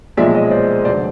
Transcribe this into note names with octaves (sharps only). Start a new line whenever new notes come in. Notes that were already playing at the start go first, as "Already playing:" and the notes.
B1 A#2 F3 G#3 D5 E5
C#5 D#5
C5 D5
F1 D3 F#3 C5 D5